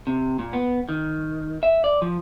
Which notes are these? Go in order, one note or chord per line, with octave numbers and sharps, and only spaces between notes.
C3
A#2
B3
D#3
E5
D5
F3